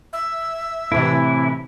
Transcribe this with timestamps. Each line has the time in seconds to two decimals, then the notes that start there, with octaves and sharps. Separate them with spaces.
0.13 E5
0.92 A2 C3 E3 E4